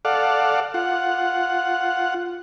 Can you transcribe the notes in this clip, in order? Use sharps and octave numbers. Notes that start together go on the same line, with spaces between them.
A4 D5 F5 F#5
F4 F#5